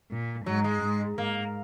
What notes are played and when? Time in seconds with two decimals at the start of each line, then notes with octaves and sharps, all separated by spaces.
0.11 A#2
0.46 G#2 F#3
0.64 G#3
0.82 G#2
1.17 G#2 A#3